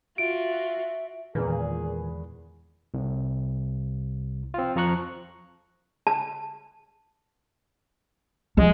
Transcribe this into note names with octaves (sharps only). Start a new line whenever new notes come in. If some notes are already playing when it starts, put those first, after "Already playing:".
F4 F#4 E5 D7
E2 A#2 D#3 G#3 G#4 B4
C2
C4 F4
F2 F3 A#5 C#6 F#6
A5
F3 G3 G#3